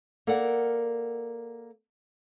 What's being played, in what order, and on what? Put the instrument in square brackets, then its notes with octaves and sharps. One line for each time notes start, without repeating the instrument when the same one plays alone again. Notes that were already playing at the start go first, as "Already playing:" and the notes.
[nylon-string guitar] A#3 A4 A#4 D5 F#5